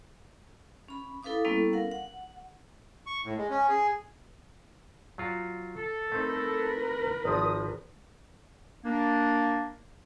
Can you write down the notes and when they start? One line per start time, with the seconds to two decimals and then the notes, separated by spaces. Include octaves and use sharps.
0.88 C#4 B5
1.23 E4 A4 B4 F5 D6 D#6
1.45 G3 A#3 B3 C#4 E4 A4
1.73 A#4 F5 F#5
1.91 F#5
3.07 C#6
3.24 A2
3.37 G#3
3.50 C#4
3.69 G#4
5.18 F#3 F4 F#4
5.77 A4
6.12 A3 C4 D#4 A#4 B4
7.25 G#1 F3 D#6
8.84 A#3 D4